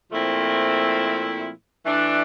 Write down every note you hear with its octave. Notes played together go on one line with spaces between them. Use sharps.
A#2 F3 A3 C4 E4
E3 A3 D4